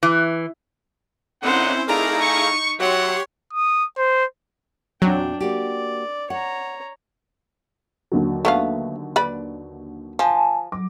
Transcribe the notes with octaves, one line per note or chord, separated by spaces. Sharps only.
E3
A#2 D3 C4 C#4 D#4 E4 C5 F#5
A3 D#4 E4 G#4 A#4 D5 F5 A#5
C#6
F#3 F#4 G4 C#5 E5 F#5 C6
D#6
C5
E2 A#2 F#3 C4 D4 G5
A#3 F#4 G4 D5
C#5 F#5 A#5
D#2 D3 F#3
A3 B3 F5
B4 D5 B5
F3 G#5 A5
F#3 D6